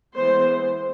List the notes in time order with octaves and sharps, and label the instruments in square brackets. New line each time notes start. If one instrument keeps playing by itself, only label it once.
[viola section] E3 G#3 B3 C5